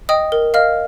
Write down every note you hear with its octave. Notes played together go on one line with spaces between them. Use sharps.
D#5 G5 D#6
A#4
D#5 F5 F6